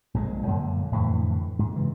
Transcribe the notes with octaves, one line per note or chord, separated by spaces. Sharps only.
A#1 A#2 D3 G#3
F#2 A#2 D3
F2 A2 D3 E3
G#2
C#3 E3